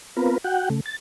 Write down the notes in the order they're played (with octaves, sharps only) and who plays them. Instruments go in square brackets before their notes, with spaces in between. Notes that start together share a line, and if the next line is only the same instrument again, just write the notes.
[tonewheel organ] B3 C4 F4 A#4 B4
F#4 F#5 G5
C#3 A3
A6